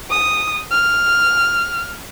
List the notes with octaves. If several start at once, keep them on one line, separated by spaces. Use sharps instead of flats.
D#6
F6